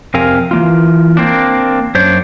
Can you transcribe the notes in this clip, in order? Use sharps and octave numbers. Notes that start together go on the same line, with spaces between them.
F2 C3 C4 A#4 F5 G#5
E3 A#3 F4
A#3 C4 D4
F#2 D4 C5 C#5